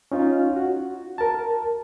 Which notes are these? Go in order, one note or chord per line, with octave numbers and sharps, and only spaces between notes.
C#4 D#4 F4
F#4
A#4 A5